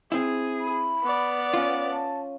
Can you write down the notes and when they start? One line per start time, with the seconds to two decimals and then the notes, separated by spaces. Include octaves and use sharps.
0.12 C4 E4 G#4
0.60 B5
1.04 B3 D5
1.54 C#4 F4 F#5
1.91 A5